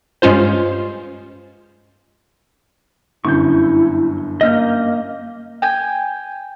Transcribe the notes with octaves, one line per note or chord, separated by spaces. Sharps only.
G2 G#3 C#4 F4 C5
G1 F#2 E4 C#6 G6
A#3 D#5 F6 G6
G5 G#5